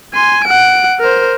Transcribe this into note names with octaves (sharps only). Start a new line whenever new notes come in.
G#5 C6
F#5 D7
A#4 C5